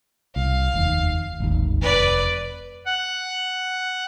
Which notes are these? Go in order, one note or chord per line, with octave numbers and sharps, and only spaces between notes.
C2 F5
F1 D#2
D1 G#1 D#2
F1 B4 D5
F#5